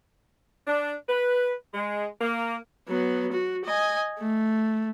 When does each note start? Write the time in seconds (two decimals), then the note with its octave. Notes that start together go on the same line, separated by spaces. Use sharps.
0.67 D4
1.09 B4
1.74 G#3
2.21 A#3
2.88 F#3 B3
3.32 F#4
3.65 D#5 G#5
4.19 A3